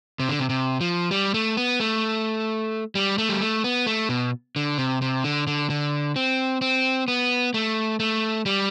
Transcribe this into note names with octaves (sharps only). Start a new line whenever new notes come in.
C3
D3
C3
C3
F3
G3
A3
B3
A3
G3
A3
G3
A3
B3
A3
B2
D3
C3
C3
D3
D3
D3
C4
C4
B3
A3
A3
G3